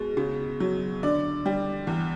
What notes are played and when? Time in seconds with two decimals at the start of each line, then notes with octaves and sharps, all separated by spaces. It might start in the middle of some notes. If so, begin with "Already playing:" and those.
Already playing: B2 G#3
0.17 C#3
0.60 F#3
1.03 D3 D5
1.46 G3
1.87 E2